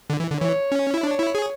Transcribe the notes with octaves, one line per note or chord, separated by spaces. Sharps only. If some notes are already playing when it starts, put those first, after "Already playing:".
D3
E3
D3
E3 C#5
C#4
E4
D4 C#5
E4
G#4